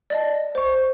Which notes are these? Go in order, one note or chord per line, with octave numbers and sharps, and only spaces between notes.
D5 D#5 A5
C5 C#6